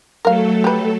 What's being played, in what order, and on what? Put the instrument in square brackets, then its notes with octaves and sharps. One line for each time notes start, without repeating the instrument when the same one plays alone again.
[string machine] F#3 A3 A4 [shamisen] A#4 F5
[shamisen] G4 B4